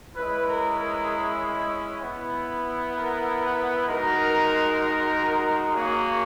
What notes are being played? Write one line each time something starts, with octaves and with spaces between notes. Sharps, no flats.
G#3 C#4 E4 B4
A#4
A#4
B3 E4
A#4
B4
G#3 D#4 F#4 A#4
A#3 C#4 F#4 G#4